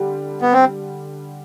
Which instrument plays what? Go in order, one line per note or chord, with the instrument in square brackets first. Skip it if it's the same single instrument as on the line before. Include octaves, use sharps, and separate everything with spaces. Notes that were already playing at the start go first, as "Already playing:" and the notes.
Already playing: [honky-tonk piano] D3 G3
[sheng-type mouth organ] B3
C4